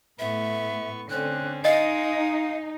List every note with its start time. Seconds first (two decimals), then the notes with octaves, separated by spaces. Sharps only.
0.19 A2 B3 E5 C#6
1.10 D3 C4 C#4 F#6
1.65 G#3 D#4 D#5 F5 D#6